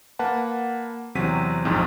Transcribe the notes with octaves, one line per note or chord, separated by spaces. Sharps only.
A#3 B4 F#5 A5
E2 C3 F#3 C4 B6 D#7
A#1 F2 G#2